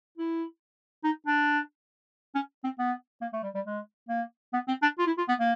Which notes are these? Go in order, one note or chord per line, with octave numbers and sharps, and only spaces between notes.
E4
D#4
D4
C#4
C4
B3
A#3
A3
G3
G3
G#3
A#3
B3
C4
D4
F4
E4
F4
B3
A#3